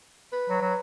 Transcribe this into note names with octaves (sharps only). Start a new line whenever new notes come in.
B4
F#3
F#3